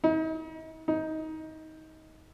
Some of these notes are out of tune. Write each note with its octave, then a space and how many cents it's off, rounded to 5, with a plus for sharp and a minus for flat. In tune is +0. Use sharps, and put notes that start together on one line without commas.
D#4 +40
D#4 +20